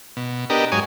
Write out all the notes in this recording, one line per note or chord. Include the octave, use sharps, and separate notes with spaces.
B2
B3 D4 G4 A#4 D#5
G#2 F#3 C#5 G#5 D#6